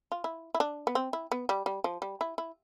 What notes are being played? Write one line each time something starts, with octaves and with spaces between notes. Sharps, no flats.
F4
E4
E4
D4
B3
C4
E4
B3
G3
G3
F3
G3
E4
E4